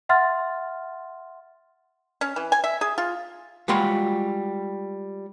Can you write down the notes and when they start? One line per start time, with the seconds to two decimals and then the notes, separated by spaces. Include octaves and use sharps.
0.09 E5 F#5 C6 F6 A6
2.21 C#4
2.36 E3
2.52 G#5
2.64 E5
2.81 G#4
2.98 F4
3.68 G3 G#3 F4 F#4 B5 C6